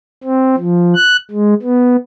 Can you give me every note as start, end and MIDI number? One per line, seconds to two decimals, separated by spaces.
0.24 0.55 60
0.58 0.94 53
0.95 1.17 90
1.31 1.54 56
1.62 1.96 59